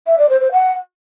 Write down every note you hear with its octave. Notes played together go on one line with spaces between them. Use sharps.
E5
D5
C5
C5
F#5